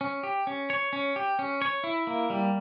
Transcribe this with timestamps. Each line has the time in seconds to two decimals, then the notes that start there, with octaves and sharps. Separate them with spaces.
0.01 C#4
0.23 G4
0.47 C#4
0.70 C#5
0.93 C#4
1.16 G4
1.39 C#4
1.62 C#5
1.84 E4
2.07 A#3
2.30 G3